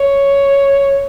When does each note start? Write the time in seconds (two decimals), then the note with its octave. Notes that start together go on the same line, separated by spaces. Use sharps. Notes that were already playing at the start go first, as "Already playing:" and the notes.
Already playing: C#5